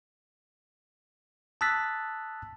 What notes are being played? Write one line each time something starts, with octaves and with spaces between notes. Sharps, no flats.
A5 D#6 E6 F#6 A6 B6